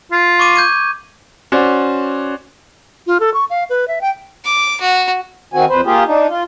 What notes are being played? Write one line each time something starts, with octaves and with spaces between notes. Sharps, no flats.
F4
C#6 D6 D#7
G6 G#6 D#7
C#4 F#4 C5 D5
F4
A4
C#6
F5
B4
E5
G5
D6
F#4
D#3 C4 F#4 G#5
F2 B4 C5
A#3 F4 G4 G#4
D4 D#4
F4